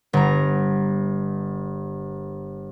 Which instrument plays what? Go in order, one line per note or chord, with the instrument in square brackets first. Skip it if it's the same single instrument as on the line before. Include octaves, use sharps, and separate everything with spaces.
[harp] G1 A#5